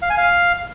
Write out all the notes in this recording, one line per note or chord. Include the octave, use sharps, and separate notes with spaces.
F5
G#5
F5